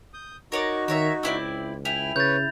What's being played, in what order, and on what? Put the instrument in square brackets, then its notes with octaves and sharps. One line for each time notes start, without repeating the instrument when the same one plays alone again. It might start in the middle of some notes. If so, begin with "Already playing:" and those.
[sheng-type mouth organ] D#6 G6
[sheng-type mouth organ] D#4 F#4 [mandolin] A#4 C#5 D5
[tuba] D#3 [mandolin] A#4 C#5 E5
[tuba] C#2 [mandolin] C4 E4 D5
[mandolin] E4 [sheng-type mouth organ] G5 G#5 [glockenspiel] F7
[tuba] C#3 [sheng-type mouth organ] B4 C#5 [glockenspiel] G6 A6